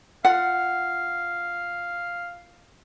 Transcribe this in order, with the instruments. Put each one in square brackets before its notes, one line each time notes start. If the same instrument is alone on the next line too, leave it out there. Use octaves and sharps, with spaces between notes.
[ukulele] F4 F#5 [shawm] F5